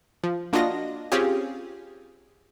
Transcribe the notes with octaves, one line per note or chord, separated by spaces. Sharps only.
F3
A#3 D4 F4 F#4 D#5 A#6
C4 C#4 F4 G4 G#4